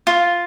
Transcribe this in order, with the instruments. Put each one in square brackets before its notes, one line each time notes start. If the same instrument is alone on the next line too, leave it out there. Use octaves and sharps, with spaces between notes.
[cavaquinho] F4